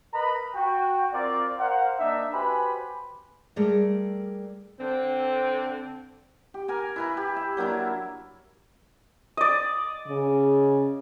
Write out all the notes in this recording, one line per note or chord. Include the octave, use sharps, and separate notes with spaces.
A#4 B4 D#5 A#5 B5
F#4 G5
C4 F4 A#4 D5
A#4 C5 F5 F#5
A#3 D4 D#4 E5
F#4 G4 B4 C5 G#5 B5
G3 A3 G#4 A#4 D5
D3 C4
G4
A#4 G#5 D6
E4 B4 B5
G4
E5
F#3 A#3 D4 E4
D5 D#5
C#3